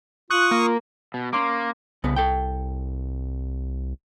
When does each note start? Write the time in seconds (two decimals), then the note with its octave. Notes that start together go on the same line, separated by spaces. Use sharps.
0.30 F4 C#6 D#6 F#6
0.51 A#3
1.14 B2
1.33 A#3 C#4 C6 D6
2.04 C2 C#3 B3 B4
2.16 A4 G5